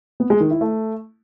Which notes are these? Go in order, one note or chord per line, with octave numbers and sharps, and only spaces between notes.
B3
G#3
D#3
E4
A3